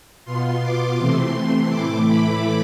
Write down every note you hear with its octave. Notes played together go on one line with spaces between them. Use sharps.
B2 B3 F4 C6
D6
C3 E3 A3 C4 C6
A2 E3 A3 E4 D6
B5